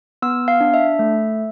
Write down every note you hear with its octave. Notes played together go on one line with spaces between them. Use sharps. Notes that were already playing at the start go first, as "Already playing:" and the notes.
B3 E6
F5
D4
E5
A3